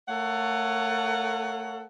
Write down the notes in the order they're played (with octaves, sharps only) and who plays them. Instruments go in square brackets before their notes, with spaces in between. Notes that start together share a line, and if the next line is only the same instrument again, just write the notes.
[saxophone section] A3 A4 A#4 C#5 F5 F#5